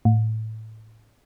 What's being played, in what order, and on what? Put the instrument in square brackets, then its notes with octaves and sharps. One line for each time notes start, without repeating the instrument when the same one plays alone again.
[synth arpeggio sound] A2